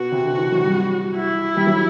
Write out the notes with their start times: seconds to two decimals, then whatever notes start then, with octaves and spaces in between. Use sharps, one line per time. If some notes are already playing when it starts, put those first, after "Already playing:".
Already playing: B2 B3 F#4
0.12 C3
0.25 D3
0.38 E3
0.52 F#3
0.64 G2 G3
1.15 E4
1.57 G3
1.67 F#3